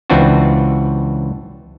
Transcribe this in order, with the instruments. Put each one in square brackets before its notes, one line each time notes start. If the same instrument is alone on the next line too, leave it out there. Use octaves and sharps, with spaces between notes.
[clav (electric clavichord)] C#2 E3 C4 D4 F4 F#4